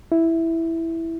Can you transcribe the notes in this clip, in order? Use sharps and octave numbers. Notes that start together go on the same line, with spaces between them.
E4